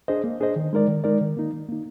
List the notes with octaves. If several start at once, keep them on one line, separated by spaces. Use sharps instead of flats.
D4 G#4 C5 D#5
A#3
D4 G#4 C5 D#5
D#3
G#3 D#4 A#4 D5
D#3
G#3 D#4 A#4 D5
D#3
A#3 D#4
D#3
A#3 D#4